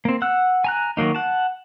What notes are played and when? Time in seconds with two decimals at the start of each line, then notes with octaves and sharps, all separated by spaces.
0.05 A#3 C4
0.22 F#5 E6 F#6
0.64 G#5 A#5 F#6
0.97 D#3 F#3 A#3 D#4
1.15 F#5 A5